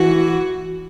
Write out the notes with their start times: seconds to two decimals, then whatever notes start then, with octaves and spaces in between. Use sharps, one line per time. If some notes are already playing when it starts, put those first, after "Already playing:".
Already playing: E3 F#4